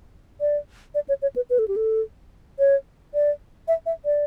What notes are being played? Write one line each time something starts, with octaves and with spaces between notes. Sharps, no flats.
D5
D5
C#5
C#5
B4
B4
A4
G4
A4
C#5
D5
E5
E5
D5